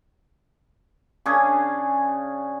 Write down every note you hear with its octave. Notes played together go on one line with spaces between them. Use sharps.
C#3 C#4 D4 G#4